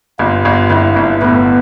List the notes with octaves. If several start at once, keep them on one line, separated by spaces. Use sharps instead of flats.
G1 F4
G1
G1 E4
G1
A2 B3